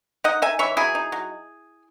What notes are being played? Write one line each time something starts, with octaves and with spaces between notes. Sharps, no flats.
D#4 D#5 F#5
D#4 E5 G#5
E3 C#5 E5
F#3 E4 G#4
D#4
F#3